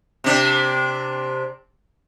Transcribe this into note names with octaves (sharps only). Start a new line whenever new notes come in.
C3 D4